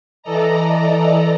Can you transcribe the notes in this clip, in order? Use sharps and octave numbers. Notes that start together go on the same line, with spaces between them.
E3 A4 D5 D#5 A#5